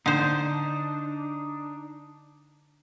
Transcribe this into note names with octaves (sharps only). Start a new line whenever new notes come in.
D3 D4 D#4 C5